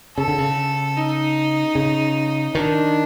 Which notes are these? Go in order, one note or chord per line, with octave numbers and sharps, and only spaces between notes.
C#3 A4
D3
C#3
D#4
C#3
D#3 D4